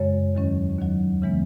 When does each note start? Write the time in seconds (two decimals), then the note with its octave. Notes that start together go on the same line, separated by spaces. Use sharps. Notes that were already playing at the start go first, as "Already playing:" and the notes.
Already playing: F#2 C#3 G#3 C#5
0.35 E2 D#3 F#3 C#4
0.78 D#2 D#3 F#3
1.22 C#3 E3 G#3 B3